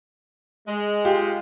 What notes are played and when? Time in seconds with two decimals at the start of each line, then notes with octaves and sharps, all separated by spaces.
0.67 G#3
1.05 F4 G4